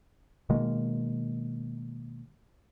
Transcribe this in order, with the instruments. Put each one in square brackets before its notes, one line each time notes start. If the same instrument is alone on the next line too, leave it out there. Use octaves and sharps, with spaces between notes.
[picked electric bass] B2 D#3 G#3 A#3